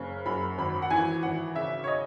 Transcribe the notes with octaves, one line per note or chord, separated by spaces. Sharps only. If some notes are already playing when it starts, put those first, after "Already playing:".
Already playing: F#1 C#3
F#2 B5
G#1 B5
F#5
E3 G#5
G#1 F#5
C#3 E5
C#5
D#5